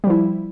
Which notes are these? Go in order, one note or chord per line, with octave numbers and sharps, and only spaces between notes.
F3 G3 E4